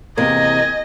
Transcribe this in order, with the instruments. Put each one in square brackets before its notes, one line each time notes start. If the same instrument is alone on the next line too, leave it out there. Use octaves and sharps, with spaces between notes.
[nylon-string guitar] E2 C3 A#3 [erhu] D#5 [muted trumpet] G#5